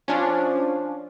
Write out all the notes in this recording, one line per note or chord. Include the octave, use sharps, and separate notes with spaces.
F3 C#4 D4